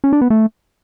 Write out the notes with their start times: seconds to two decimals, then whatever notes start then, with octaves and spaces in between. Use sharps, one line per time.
0.04 C#4
0.13 D4
0.21 B3
0.30 A3